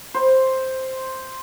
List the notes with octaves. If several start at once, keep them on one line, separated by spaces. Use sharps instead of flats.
C5